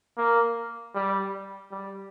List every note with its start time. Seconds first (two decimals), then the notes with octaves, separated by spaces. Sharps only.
0.18 A#3
0.95 G3
1.72 G3